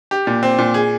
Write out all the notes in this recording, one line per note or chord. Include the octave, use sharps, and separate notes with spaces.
G4
A#2
C4
A#2
G#4